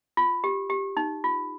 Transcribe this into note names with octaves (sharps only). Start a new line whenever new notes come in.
F4
G4
G4
D#4
F4